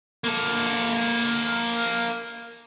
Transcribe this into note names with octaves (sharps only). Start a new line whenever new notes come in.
A#3 A4